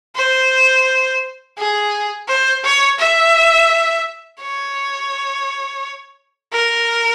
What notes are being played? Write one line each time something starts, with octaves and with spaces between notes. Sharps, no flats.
C5
G#4
C5
C#5
E5
C#5
A#4